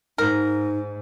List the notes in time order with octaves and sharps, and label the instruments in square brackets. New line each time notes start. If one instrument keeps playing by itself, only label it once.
[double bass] G#2 [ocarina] D#4 [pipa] A#4